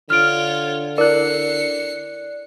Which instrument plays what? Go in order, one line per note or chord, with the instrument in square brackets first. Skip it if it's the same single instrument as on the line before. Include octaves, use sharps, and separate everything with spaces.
[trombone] D3 [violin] F4 C#5 [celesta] F6 D7
[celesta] E4 A#4 [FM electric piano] D5 F#6 [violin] C7 C#7